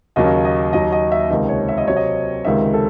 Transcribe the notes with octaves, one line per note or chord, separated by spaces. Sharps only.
D#2 C#3 F#3 C#4 D#5
D#5
D#2 D#3 F#3 D#5
D#5
E5
C#2 C3 D#3 D#5
C#5
E5
D#5
C3 F#3 C4 C#5
D#5
C#2 C3 D#3 G#3 E5
A4